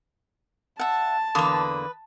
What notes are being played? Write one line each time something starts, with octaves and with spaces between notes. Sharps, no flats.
E5 F#5 A5
E2 D3 A#3 B4 D#6